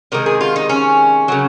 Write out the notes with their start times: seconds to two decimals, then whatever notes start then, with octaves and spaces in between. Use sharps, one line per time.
0.12 C3 D#3 G#3 A#4
0.26 G#4
0.41 F4
0.56 D#4
0.69 C#4
1.28 C#3 F#3